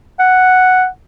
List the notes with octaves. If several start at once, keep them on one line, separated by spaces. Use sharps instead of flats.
F#5